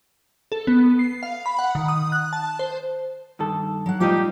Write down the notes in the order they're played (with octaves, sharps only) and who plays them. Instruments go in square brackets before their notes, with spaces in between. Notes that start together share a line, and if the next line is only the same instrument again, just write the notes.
[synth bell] A4
B3
C7
F5
B5
F#5
D#3
D#6
F#6
A5
C5
[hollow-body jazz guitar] G2 D#3 A4
[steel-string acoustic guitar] F#3 F#5
[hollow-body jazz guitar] A2 D#4 [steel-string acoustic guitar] G3 C5 D5 [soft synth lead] F4 [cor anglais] G4